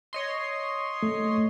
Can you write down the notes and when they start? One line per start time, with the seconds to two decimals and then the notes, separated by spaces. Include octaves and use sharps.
0.13 C#5 D#5 C6
1.03 A3